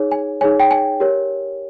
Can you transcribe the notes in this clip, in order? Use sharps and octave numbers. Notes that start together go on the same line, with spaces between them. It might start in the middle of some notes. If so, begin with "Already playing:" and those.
Already playing: D#4 G#4 C#5
G#5
D#4 G#4 C#5 G#5
G5
G#5
G4 A#4 C#5